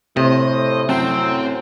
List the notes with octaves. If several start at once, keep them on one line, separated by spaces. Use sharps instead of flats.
A2 C3 A3 C5 D#5
F#2 A2 F#3 C4 G5